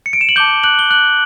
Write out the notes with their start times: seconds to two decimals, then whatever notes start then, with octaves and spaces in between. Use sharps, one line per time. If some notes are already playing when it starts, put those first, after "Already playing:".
0.06 C#7
0.13 D7
0.21 E7
0.29 F#7
0.36 A5 D6 F#6 G6 G7
0.64 F#6 F#7
0.79 G7
0.90 F#6 F#7